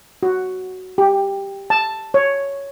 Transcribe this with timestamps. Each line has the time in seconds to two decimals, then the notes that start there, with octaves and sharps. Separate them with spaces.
0.23 F#4
0.98 G4
1.70 A5
2.14 C#5